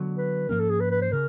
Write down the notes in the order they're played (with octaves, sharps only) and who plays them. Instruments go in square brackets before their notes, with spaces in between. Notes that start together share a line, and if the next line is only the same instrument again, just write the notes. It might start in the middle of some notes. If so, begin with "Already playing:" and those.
Already playing: [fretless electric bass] D3 F#3 B3
[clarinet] B4
[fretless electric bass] G#2 F3 A#3 C#4 [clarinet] A#4
[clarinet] A4
G#4
B4
B4
C5
[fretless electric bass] C#3 [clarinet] A#4